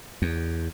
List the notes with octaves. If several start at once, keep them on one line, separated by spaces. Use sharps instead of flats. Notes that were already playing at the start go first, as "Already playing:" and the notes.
E2